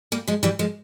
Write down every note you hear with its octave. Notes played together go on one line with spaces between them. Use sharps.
G3 A#3
F3 G#3
E3 G3
F3 G#3